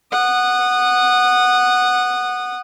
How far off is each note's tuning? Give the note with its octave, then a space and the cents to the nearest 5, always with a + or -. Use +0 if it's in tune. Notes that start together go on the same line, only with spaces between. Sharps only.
F#5 +0 D#6 -20